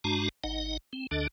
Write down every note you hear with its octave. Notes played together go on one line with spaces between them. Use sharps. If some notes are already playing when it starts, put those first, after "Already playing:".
G2 G#3 D4 F#4 A5 A#5
G#1 D#4 D#5 F#5
C4
D2 D3 D4 A4 D#5